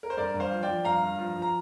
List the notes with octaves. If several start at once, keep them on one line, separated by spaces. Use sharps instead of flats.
A#4
C5
G2 A#4 D5
G2
C5 F5
F3
D5 G5
F3
G2 F5 A#5
G2
F3
F3
A#5